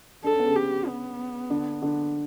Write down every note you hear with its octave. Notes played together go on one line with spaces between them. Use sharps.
D4 A4
C#4
B3
C#3 C#4
G4
B3
D3 D4
D3 D4